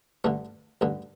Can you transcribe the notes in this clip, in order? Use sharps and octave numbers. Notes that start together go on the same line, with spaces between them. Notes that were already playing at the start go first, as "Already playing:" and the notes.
A1 G2 D3 A3
A1 G2 D3